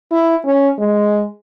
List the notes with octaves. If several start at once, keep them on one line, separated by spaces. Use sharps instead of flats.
E4
C#4
G#3